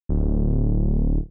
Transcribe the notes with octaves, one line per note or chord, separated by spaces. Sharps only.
D1